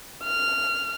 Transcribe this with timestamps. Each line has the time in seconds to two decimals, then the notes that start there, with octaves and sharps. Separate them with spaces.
0.23 F6